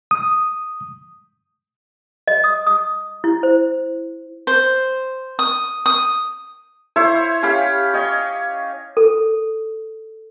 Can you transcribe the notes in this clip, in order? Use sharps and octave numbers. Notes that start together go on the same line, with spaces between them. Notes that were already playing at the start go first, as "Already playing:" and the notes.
D#6
D#5
D#6
D#6
E4
C5
C5
D#6
D#6
E4 C5 C#5 E5
C#4 G4 F5 B5
C#5 D#5 G5
A4